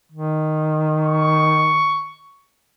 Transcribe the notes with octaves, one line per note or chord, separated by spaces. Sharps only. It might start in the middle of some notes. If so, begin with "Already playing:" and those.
D#3
C#6